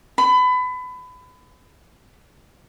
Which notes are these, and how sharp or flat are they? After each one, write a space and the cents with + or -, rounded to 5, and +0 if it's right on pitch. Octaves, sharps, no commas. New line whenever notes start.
B5 +25